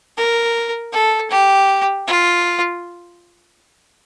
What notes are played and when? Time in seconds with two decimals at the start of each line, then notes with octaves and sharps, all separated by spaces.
0.17 A#4
0.93 A4
1.30 G4
2.07 F4